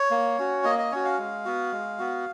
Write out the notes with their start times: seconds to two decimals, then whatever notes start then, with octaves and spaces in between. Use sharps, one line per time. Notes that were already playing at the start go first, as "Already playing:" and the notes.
Already playing: C#5
0.11 A#3
0.38 C#4 F#4
0.64 A#3 D#5
0.79 D#5
0.92 C#4 F#4 C#5
1.05 F5
1.18 G#3
1.45 B3 F#4
1.72 G#3
1.99 B3 F#4